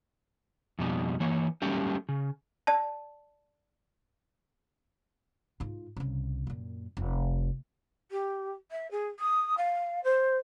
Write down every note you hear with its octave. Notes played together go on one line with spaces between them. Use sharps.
F2 B2 G3 D#4
E3 A#3 C#5
F#3 G3 A3 A#3 C#4 G4
C#3
D5 A5
G#2 F4
C2 C#3
F#2 A#2
F1
G4
E5
G#4
D#6
F5
C5